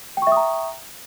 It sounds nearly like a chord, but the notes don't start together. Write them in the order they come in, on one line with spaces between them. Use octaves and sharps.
G5 C#6 E5 D#6 A#5